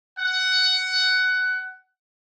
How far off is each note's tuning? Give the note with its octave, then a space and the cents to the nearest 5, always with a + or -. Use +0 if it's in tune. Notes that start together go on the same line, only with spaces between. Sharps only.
F#5 +15